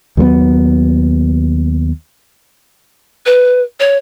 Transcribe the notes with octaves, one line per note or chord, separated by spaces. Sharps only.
D#2 F#3 G#3 B3
B4
C#5